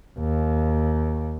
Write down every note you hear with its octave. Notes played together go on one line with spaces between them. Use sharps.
D#2